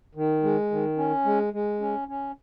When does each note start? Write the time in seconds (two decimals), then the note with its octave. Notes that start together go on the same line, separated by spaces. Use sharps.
0.15 D#3
0.43 G#3
0.71 D#3
0.97 C#4
1.25 G#3
1.53 G#3
1.80 C#4
2.08 C#4